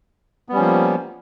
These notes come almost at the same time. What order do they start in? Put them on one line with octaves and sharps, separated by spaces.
B3 G3 C#4 F3 A#3